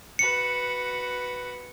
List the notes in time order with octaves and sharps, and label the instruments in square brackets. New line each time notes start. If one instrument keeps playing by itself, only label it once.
[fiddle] F#4 B4 [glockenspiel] C#7